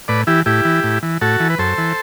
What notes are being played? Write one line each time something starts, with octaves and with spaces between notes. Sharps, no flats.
A2 B4 D5
E3 E4 G4
A2 E4 G4
E3
A2
E3
A2 F#4 A4
E3
B4
F#2 A4 C5
E3